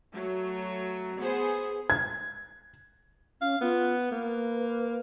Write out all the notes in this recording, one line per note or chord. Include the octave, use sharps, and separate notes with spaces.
F#3 A3
B3 G#4 C5
G#6
C#4 F5
B3 F4
A#3 B4